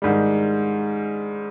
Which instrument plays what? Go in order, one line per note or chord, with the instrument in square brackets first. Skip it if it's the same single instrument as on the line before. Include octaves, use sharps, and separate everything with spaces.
[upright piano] G#2 D#3 G3